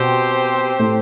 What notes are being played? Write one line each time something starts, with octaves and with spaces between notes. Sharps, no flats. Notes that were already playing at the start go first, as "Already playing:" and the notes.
Already playing: B2 B3 C4 G4 C5
A2 A3